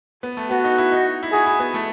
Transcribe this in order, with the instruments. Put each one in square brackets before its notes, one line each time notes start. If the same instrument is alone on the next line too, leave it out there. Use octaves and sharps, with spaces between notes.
[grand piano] B3
A3
[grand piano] B3 [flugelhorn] F#4
[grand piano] D#4
E4
D#4
E4
[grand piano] F#4 [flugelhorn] G#4
[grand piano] E4
B3
A3